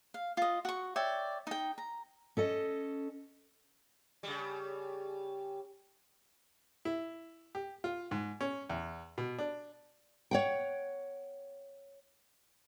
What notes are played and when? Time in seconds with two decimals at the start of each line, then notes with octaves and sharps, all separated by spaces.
0.14 F5
0.37 F4 D#5
0.65 F#4 C#6
0.96 C#5 D5 E5 G5
1.47 D#4 G5
1.78 A#5
2.37 C#4 A4 D#5
4.23 C#3 G3
6.85 E4
7.55 G4
7.84 F4
8.11 G#2
8.41 C#4
8.70 E2
9.18 B2
9.39 D4
10.31 C#5 F#5 G5